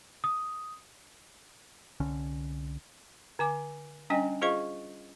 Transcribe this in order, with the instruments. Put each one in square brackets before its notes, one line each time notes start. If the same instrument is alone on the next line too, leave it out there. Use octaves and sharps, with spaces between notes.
[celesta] D#6
[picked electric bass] C2 D3 C#4
[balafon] D3 G#5 D6
G3 C#4 D4 D#5 G5 G#5
F4 G#4 C5 D#5 F5 C#6